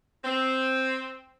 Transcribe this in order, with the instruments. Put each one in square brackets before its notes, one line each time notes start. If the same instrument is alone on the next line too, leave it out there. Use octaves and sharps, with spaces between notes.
[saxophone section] C4